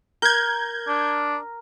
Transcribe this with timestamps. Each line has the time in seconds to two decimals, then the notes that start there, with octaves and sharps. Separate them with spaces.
0.22 A#4 G6 G#6
0.88 D4